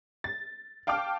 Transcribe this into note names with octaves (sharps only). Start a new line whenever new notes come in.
A6
F5 G5 A5 D6 F6